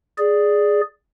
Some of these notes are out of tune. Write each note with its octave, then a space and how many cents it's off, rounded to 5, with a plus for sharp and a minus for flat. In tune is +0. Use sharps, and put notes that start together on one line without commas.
G#4 +0 D5 +0